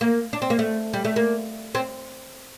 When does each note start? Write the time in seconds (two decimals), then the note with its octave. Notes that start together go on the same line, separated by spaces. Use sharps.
0.01 A#3
0.33 D4
0.42 C4
0.50 A#3
0.59 A3
0.93 G3
1.05 A3
1.16 A#3
1.75 C4